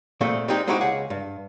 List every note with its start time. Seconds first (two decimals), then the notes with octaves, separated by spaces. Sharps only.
0.21 A#2 A3 C4 G#4
0.48 G3 G#3 C4 D#4 G4 G#4
0.67 G#3 C4 D#4 E4 F#4 G4
0.81 C#2 G#4 F#5
1.10 G2